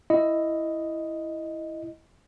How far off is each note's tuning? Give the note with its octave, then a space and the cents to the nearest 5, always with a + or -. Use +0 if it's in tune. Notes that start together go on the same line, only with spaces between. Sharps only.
E4 +0 D#5 +0